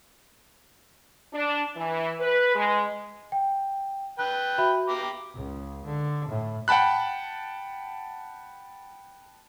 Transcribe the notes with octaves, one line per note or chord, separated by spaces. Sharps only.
D4
E3
B4
G#3
G5
B4 G5 F#6
F#4 E5 B5
G4 A#5 D6
C#2
D3
A2
F#5 G5 A5 B5 F#6